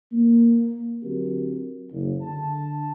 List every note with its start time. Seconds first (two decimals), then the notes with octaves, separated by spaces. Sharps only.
0.12 A#3
1.03 D3 F#3 C4 F#4 G4 A#4
1.90 F#1
2.21 D3 A5